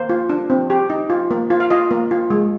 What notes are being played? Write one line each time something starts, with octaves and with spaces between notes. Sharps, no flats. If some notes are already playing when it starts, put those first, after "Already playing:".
Already playing: A#3 C5
F4
D4
C4
G4
D#4
F4
A#3
F4
F5
F4 D#5
A#3
F4
G#3